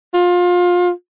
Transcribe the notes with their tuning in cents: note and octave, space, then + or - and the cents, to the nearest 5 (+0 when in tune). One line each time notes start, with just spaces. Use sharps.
F4 +25